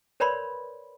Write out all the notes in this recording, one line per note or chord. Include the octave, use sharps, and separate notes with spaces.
A#4 B4 C#5 D5 B5 C6